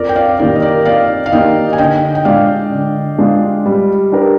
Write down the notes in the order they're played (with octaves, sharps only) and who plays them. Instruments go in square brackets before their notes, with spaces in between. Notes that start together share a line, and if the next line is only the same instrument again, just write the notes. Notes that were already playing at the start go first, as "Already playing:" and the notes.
Already playing: [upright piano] F2 [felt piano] A#4 D5
[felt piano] G5
D5 F5
[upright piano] D#3 A#3 D#4 G4 [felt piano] A#4 D5
[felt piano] D#5
A#4 D5
[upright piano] F2 [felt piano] D5 F5
[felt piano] F5
[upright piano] D#3 A#3 D#4 G4 [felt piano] D#5 G5
[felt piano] G#5
[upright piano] D3 [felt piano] D#5 G5
[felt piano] G5
[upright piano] G#3 D4 F4 [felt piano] D5 F5
[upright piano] D3
G#3 D4 F4
G3
D4 G4 A#4